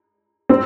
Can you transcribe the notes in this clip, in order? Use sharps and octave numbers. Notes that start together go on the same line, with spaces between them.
C4